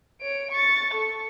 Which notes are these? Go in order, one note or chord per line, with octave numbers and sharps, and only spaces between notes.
C#5 D7
C#6 A6
A4 C#6